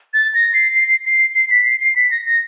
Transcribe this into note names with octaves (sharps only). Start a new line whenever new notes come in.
A6
A#6
C7
C7
C7
C7
B6
C7
C7
B6
A#6
A#6